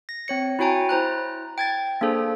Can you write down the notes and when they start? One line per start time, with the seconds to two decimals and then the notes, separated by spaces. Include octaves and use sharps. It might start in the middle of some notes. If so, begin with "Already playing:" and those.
0.09 A#6
0.28 C4 C#5 C#7
0.59 E4 F#4 C#5 G5 G#5 A#5
0.89 E4 C5 A#5 F#6
1.58 G5 G#6 A6
2.01 A#3 D4 G#4 A4 C5